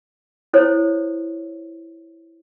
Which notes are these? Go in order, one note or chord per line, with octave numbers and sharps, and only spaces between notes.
E4 A4 C5 C#5